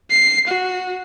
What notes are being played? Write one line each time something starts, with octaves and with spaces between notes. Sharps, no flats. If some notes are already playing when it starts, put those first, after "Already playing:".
C7
F#4